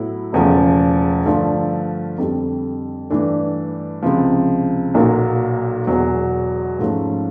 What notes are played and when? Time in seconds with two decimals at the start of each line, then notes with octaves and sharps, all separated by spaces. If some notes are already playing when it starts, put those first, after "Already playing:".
Already playing: A2 F#3 B3 E4
0.33 E1 E2 C#3 F3 A3
1.26 G2 D3 F3 A3
2.18 F2 D3 G3
3.10 G2 E3 A3 D4
4.02 C#2 C3 F3
4.94 B1 A#2 F#3 A#3
5.87 E1 E2 B2 F#3
6.79 G#2 F3 A3 C#4